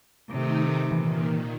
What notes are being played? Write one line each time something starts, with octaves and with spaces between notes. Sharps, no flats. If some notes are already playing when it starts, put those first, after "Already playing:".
C3 D#3 A3 D#4
A#2 D#3 E3